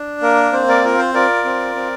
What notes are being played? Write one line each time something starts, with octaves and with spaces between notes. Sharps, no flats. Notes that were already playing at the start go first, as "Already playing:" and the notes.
Already playing: D4
A#3 A#4
C4 C5
A#4 D5
F4 A#4
C5
F4 A#4 D5
C4
C4